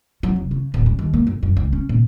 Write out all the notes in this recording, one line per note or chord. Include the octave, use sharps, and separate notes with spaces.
F#3
F1
C#3
D1
G2
D#2
A#3
G1
F#2
C#2
C#4
A#2